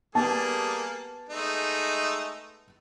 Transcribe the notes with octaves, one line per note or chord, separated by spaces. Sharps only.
G3 A#3 B3 G#4 A5
G#3 A3 D#4